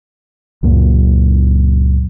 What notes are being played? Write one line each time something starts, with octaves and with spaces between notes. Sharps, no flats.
C#2 F#2 A#2